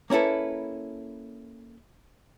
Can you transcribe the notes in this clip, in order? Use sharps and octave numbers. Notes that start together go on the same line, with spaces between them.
A#3 C#4 E4 A4 B4